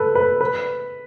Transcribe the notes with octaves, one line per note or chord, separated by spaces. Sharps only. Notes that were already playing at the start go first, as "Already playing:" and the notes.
Already playing: A4 B4
B4
B4